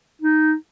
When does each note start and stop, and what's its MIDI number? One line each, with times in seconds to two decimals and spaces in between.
0.22 0.55 63